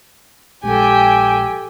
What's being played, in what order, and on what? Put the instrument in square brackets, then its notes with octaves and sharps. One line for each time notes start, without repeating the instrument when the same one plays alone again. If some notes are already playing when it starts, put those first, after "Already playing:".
[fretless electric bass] A#1 G#3 [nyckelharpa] G4 A4 [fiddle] G5 G#5